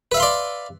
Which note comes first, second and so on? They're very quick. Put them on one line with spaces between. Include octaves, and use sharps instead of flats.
B4 E5 F5 C6 D5